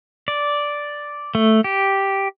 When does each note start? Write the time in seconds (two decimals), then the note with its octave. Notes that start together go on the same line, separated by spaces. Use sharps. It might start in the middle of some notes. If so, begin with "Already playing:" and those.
0.28 D5
1.35 A3
1.64 G4